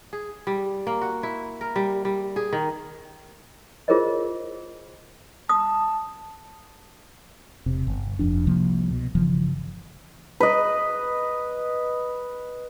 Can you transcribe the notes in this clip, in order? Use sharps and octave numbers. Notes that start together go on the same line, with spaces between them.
G#4
G3
A#3
F#4
E4
A#4
G3
G3
G#4
D#3
F4 G#4 A#4 C5 C#5 D#5
A5 D#6
E1 C3
G1
F1 F2 D4
C2 C3 F3 A#3
B2
G1 C#3 E3 F3
B4 D#5